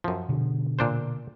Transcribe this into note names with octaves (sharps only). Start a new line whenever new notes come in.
F#2 F3
B2 D3
A#2 D4 C5